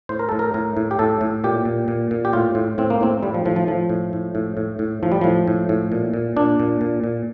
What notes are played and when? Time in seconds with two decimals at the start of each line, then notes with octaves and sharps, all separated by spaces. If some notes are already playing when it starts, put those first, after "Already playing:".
0.09 A2 C5
0.19 A#4
0.29 A2 A4
0.39 A#4
0.54 A2 A#4
0.77 A2
0.91 G4
0.99 A2 A4
1.21 A2
1.44 A#2 G4
1.65 A#2
1.88 A#2
2.11 A#2
2.25 G4
2.33 A2 F4
2.55 A2
2.78 A2 C4
2.90 A#3
3.01 A2 C4
3.23 A2 G3
3.34 F3
3.45 A2 F3
3.56 F3
3.68 A2 F3
3.89 A2
4.13 A2
4.35 A2
4.57 A2
4.79 A2
5.03 A2 F3
5.12 G3
5.21 A2 F3
5.48 A2
5.69 A2
5.92 A#2
6.14 A#2
6.36 A#2 D4
6.60 A#2
6.81 A#2
7.04 A#2